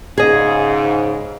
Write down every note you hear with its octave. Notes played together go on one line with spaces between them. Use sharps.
G#2 C#3 G#4 D#5